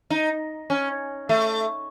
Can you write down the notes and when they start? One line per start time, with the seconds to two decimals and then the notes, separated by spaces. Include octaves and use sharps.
0.10 D#4
0.70 C#4
1.29 A3